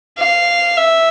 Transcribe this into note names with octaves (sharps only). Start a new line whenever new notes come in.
F5
E5